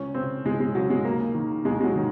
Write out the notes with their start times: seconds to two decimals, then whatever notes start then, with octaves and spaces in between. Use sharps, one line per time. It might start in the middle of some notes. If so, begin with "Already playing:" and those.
Already playing: C#2 C#4
0.14 C#3 C4
0.45 C#2 G#3
0.60 G#3
0.75 C#3 F#3
0.90 G#3
1.04 D#2 A#3
1.34 D#3
1.65 D#2 G#3
1.81 G#3
1.84 F#3
1.95 D#3